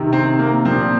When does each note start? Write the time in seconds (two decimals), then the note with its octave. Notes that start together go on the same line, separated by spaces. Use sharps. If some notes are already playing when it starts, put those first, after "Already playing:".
Already playing: C3 D#3
0.13 C4
0.39 A#3
0.65 A#2 F3 C4